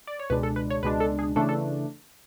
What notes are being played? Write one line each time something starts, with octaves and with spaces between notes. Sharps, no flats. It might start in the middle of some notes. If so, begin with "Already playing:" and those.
D5
C#5
C#2 B2 G#3 D4 B4
A4
B4
C#5
C#2 B2 G#3 D4 B4
A4
G#4
C#3 E3 A3 D4 A4
A4